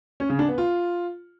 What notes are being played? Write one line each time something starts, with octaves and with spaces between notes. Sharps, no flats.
C#4
C#3
D4
B3
F4